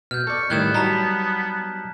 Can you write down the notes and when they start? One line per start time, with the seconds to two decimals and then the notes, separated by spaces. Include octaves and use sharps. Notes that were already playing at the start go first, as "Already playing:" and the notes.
0.11 B2 F6 G6
0.27 A4 D5 C#6
0.50 A2 D#3 G3 B3 F#6 G#6 E7
0.74 F#3 G3 D#4 A5 A#5 B6